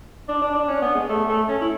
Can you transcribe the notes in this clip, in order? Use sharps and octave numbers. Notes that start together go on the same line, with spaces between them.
D4
D4
D4
C#4
B3
G#3
A3
A3
C#4
E4